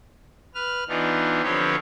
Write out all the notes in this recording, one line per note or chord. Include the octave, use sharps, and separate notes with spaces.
B4 F6
E3 B3 D4 D#4 F4
D3 F3 C4 G4 B4 C#5